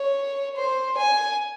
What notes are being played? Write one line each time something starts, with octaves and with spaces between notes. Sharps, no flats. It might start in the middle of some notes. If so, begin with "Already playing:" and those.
Already playing: C#5
C5
G#5